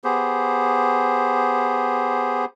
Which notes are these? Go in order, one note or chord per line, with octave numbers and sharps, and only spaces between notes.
B3 G4 G#4 C5